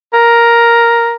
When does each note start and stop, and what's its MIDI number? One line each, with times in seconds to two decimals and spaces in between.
0.13 1.16 70